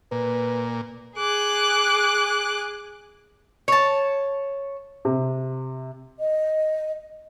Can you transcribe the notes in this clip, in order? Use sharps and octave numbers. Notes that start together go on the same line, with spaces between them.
A#2 B4
G#4 D6 F#6
C#5 A5
C3
D#5